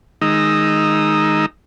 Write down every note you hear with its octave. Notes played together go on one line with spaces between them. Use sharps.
D#3 G#3 D#4 A#5 D#6 E6